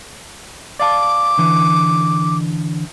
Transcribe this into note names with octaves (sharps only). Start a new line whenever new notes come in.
D5 F5 A5 D6
D3 E3